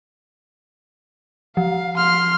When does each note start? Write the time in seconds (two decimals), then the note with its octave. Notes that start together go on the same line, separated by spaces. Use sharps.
1.57 F3 F5
1.98 C6 F6